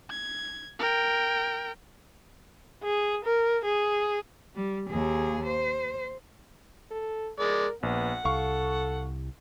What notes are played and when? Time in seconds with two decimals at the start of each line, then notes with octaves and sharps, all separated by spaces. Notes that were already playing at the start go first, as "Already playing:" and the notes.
0.10 G#6
0.79 A#4 G5
2.84 G#4
3.24 A#4
3.65 G#4
4.55 G3
4.90 D#2 G#4
5.46 C5
6.91 A4
7.40 G#3 A#4 D5
7.83 A#1 B3 F#5
8.25 C2 A4 F5 C#6